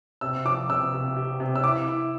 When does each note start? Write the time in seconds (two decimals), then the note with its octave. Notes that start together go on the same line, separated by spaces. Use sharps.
0.21 C3 E6
0.45 F3 D6
0.69 C3 E6
0.93 C3
1.17 G4
1.40 C3
1.55 E6
1.64 E4 D6
1.88 E4